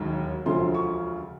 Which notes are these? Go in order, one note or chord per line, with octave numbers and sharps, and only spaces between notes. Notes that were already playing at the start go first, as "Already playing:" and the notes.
Already playing: E1 D#2 D#3 F#3
E1 D2 C#3 F3 C6
C#6